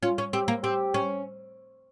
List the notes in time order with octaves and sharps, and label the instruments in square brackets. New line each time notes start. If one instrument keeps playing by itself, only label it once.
[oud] C#4 [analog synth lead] F4
[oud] C#4
[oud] C4 [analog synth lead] G4
[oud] A#3
[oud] C4 [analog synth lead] G4
[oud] C#4